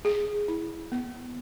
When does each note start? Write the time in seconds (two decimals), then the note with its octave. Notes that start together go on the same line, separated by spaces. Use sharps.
0.05 G#4
0.48 E4
0.92 B3